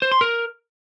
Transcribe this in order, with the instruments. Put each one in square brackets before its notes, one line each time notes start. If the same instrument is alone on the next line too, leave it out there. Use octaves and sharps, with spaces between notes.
[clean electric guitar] C5
C6
A#4